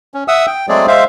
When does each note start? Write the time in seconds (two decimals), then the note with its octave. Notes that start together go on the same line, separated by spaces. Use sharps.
0.14 C#4
0.28 E5 F#5 D#6 E6
0.47 G5
0.69 F#3 G#3 A3 C4 G#4 D5
0.88 G#3 C5 E5 F5